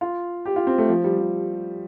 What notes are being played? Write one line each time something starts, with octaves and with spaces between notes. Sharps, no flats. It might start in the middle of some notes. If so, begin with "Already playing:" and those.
F4
G4
F4
C4
A3
F3
G3
F3